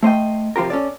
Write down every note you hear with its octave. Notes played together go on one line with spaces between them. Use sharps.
A3 C5 D#5 G5
C3 F3 F4 G4 A#4
C#4 A4 D5